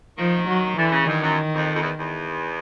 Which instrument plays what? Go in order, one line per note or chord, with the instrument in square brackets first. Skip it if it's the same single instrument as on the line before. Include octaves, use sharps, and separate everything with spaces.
[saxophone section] D#3 [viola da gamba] F3
[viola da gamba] F#3
[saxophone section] D3 [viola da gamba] E3
[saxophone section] C#3
[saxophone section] G2 [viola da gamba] D#3
[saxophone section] F#2
F2
F2
E2
E2